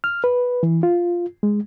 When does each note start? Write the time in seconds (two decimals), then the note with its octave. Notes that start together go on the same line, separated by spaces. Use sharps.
0.04 F6
0.24 B4
0.63 E3
0.83 F4
1.43 G#3